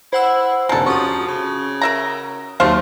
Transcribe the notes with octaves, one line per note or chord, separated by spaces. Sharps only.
E4 C5 F#5 E6
F1 D#2 G#3 D4 A4 A#5
F3 C#4 F#4 C#6 D#6
C#3
A#4 E5 A#5
D#2 F#3 A3 C4 C5 F5